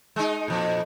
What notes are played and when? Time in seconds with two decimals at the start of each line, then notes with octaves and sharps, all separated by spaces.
0.16 G#3 D#4
0.48 F2 A#2